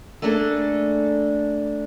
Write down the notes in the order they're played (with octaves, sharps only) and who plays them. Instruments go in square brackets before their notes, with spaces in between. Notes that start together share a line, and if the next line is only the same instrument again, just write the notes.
[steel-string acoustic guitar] A3 A#3 D4 G#4 A4